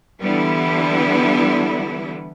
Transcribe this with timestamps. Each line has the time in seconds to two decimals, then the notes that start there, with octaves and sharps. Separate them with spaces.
0.21 D3 E3 G3 B3 E4